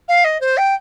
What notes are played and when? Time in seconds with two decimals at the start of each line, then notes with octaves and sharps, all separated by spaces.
0.09 F5
0.25 D#5
0.40 C5
0.57 G5